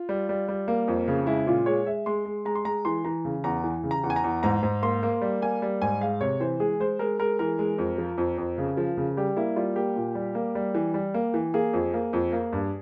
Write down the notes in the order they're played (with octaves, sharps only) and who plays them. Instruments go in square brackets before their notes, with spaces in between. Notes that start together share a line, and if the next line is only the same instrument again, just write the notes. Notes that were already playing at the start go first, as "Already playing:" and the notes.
Already playing: [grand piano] F4
G3
G3
G3
A#3
F2
C#3
G#3 E4
A#2 F4
G#3 C#5
G#3 E5
G#3 C6
G#3
G#3 A#5
C6
G#3 A#5
E3 C6
E3 A#5
C#3
E2 A#5
E3
C#3
A#5
E2
G#5
A#5
E2
G#2 A#5
G#2
A#3 C6
A#3
G3
A#3 G#5
G3
G#2 G#5
G#3 F5
C3 C#5
E3 C5
G#3 G#4
G#3 C5
G#3 A#4
G#3 A#4
E3 A#4
G#3
F2
F3
F2
F2
C#3
F3
C#3
G3 G4
A#3 E4
G3 F4
A#3 G4
A#2
G3
A#3
G3
E3
G3
A#3
E3
A#3 G#4
F2
A#3
F2
A#3
G2